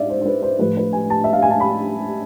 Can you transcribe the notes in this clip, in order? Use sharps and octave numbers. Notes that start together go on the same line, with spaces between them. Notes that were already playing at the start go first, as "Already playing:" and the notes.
Already playing: G#2 D5 E5 F5
C5
C5
B4
C5
A2 F3 B4
B4
G#5
A5
E5
F5
G#5
A5
B5